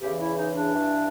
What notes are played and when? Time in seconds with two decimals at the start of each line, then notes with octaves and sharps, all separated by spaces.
0.01 E2 C#3 E3 G4
0.19 E4
0.37 D#4
0.56 D4
0.74 G2 E3